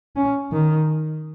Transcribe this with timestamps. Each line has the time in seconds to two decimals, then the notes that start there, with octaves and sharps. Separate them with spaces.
0.16 C#4
0.52 D#3